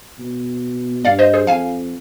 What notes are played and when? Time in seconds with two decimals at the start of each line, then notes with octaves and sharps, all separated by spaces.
0.19 B2
1.04 G2 D5 F5
1.19 C5 D#5
1.34 G#4 C5
1.47 F2 F5 G#5